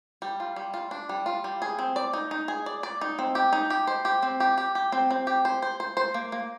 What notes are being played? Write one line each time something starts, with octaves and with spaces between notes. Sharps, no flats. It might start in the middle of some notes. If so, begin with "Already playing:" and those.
G3
F4
G3
F4
D4
G3
F4
G3
G#4
C4
D5
D#4
D#4
G#4
D5
D5
D#4
C4
G4
D#4
G4
C5
G4
C4
G4
G4
G4
C4
C4
G4
C5
C5
C5
C5
A#3
A#3